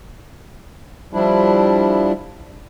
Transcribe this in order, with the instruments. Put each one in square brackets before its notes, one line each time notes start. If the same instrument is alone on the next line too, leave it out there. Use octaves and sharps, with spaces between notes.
[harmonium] F3 G3 D4 E4